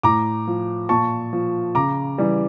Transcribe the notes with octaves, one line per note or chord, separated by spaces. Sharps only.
A2 A#5 D6
F3
A#2 A5 C#6
F3
C#3 A#5 D6
E3 G3